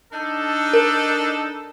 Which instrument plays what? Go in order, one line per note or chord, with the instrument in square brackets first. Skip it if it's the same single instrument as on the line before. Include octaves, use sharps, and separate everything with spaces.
[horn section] D4 D#4 A4
[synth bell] A#4